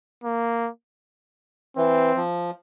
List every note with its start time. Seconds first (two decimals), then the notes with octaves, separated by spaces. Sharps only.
0.24 A#3
1.77 E3 C4
2.16 F3